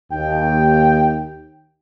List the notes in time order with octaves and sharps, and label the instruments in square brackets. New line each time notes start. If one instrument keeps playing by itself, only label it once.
[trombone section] D#2 [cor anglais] G5